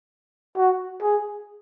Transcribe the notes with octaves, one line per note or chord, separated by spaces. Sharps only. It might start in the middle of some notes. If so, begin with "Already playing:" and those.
F#4
G#4